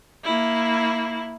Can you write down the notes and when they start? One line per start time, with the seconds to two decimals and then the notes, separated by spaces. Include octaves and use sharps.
0.23 A#3 E4